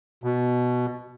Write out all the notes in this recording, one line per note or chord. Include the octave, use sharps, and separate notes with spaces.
B2